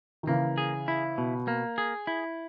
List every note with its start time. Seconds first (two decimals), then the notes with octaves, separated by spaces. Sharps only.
0.23 D#3
0.27 C#3 E3 A#3
0.58 G#4
0.88 E4
1.18 B2
1.48 A#3
1.78 G#4
2.07 E4